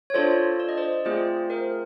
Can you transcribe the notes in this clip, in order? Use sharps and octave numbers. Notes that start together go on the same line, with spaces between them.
C#5
D4 F4 A4 C5 D5
D5
D#5
C5 D5
A3 C4 F4 G#4 C5 D5
A#4 C5